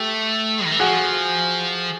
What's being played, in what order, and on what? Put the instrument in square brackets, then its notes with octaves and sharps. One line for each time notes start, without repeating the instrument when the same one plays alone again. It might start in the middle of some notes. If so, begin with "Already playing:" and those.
Already playing: [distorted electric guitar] A3 [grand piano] G4 A4
[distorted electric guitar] D#3
E3
[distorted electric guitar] F3 [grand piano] F#4 G#4